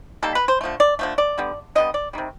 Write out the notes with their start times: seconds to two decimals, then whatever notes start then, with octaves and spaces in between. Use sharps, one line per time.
0.22 D#3 G3 A#3 A4
0.35 B4
0.48 C5
0.61 D3 F3 A3
0.80 D5
0.99 D3 F3 A3
1.18 D5
1.38 D3 G3 B3
1.75 D3 G3 B3 D#5
1.94 D5
2.13 C3 D#3 G3